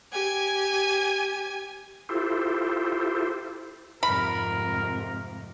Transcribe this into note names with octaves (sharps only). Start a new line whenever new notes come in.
G4 G#5 G#6
E4 F4 G4 A4 C5
F2 G#2 C3 A#4 B5